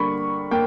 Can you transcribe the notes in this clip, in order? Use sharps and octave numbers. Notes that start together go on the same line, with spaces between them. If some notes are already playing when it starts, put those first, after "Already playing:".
Already playing: D3 G3 A#3 B5 C#6
A#3 G5